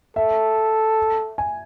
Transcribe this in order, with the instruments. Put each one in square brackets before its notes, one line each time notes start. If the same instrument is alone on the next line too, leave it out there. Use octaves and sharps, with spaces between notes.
[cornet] A4 [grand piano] E5
[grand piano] G#5